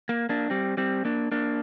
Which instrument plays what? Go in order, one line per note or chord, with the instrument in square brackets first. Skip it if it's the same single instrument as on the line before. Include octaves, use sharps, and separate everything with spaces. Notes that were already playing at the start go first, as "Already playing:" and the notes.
[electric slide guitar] A#3
A#3 D4
G3 C4
G3 C4
A#3 D4
A#3 D4